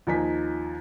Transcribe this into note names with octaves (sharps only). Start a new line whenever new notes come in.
D#2 F3 D#4 G#5 B6